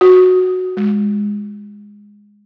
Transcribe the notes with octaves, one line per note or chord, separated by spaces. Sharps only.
F#4
G#3